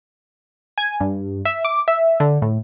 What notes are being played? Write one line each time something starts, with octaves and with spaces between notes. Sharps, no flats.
G#5
G2
E5
D6
E5
D3
A2